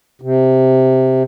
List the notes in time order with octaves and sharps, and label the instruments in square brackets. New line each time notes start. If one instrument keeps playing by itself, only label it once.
[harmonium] C3